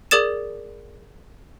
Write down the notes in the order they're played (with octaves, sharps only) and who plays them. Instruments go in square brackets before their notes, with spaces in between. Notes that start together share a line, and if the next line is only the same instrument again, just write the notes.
[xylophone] G#4 A#4 D5 D#6 A6 E7